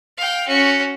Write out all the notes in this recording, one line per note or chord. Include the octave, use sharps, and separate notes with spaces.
F5 G5
C#4 F#4